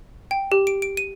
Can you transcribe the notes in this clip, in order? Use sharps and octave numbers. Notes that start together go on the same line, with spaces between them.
G5
G4
D7
D7
D#7